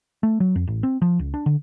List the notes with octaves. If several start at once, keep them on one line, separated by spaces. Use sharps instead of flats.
A3
F#3
F2
A1
C4
F3
C#2
D4
D3